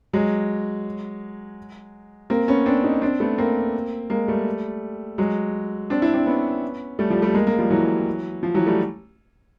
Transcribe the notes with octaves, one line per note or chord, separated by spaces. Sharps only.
F#3 G#3
A#3 C4
B3 C#4
C4 D4
C#4 D#4
C4 D4
A3 B3
A#3 C4
G#3 A#3
G3 A3
F#3 G#3
C4 D4
D4 E4
C4 D4
B3 C#4
G3 A3
F3 G3
G3 A3
G#3 A#3
G#3 A#3
F3 G3
E3 F#3
F3
E3 F#3
G3 A3